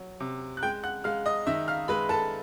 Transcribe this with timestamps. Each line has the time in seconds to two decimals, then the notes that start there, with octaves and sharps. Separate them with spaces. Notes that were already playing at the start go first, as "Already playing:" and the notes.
Already playing: F#3
0.20 C3
0.57 F#6
0.63 G#3 G5 G6
0.84 F#5 F#6
1.04 G#3 F5 F6
1.26 D#5 D#6
1.47 D#3 E5 E6
1.68 F5 F6
1.88 G#3 B4 B5
2.09 A4 A5